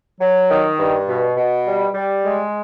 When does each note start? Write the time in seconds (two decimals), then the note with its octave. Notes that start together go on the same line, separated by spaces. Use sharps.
0.21 F#3
0.50 D#3
0.79 G2
1.08 B2
1.37 B2
1.66 G3
1.94 G3
2.24 G#3